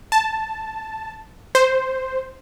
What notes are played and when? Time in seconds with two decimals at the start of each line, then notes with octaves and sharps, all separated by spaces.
0.12 A5
1.55 C5